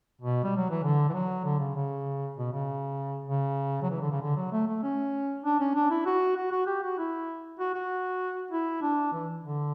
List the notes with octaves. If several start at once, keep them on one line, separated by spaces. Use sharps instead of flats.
B2
G3
F#3
E3
D3
E3
F#3
D3
C#3
C#3
B2
C#3
C#3
F#3
E3
D3
C#3
D3
F#3
A3
A3
C#4
D4
C#4
D4
E4
F#4
F#4
F#4
G4
F#4
E4
F#4
F#4
E4
D4
E3
D3